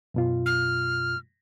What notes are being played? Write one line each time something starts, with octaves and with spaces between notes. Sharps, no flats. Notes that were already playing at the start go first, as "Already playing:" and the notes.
F#2 B2 F4
F6